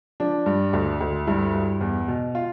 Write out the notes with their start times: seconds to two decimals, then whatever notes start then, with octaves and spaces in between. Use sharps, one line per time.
0.20 F3 D4
0.46 G2
0.73 D2
1.01 D2
1.27 G2 E4
1.54 G2
1.81 E2
2.08 B2
2.35 F4